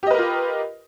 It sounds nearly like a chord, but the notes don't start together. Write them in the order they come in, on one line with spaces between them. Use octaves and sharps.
G4 D#5 B4 A#4 F4